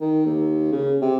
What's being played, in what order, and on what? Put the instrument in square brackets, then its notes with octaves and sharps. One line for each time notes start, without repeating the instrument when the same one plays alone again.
[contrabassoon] D#3
D#2
C#3
C3